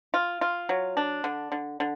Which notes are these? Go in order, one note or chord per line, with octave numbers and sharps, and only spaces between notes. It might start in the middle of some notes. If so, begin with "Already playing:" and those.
F4
F4
F#3
D4
D3
D3
D3